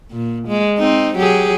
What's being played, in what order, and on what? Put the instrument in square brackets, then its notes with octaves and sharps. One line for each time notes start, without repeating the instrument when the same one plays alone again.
[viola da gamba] A#2
G#3
C4 D#4
F#3 G4 G#4